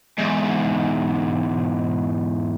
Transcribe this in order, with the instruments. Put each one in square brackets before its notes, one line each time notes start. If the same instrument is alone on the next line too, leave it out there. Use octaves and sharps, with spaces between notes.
[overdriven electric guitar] E2 G#2